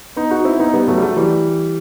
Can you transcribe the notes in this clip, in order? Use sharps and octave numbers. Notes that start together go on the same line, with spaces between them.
B3 D#4
D#4 F#4
C4 E4
B3 D#4
G3 B3
F#3 A3
G3
F#3 A3
E3 G3